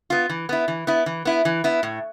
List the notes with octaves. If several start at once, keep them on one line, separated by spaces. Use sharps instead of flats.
B3 F4
E3
B3 E4
E3
B3 E4
E3
B3 E4
E3
B3 E4
A2